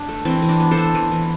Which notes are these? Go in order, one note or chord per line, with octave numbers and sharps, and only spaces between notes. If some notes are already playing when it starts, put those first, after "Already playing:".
Already playing: D4
A3
E3 C4
E3
D4
B3
A4 C5
B3
E3
E3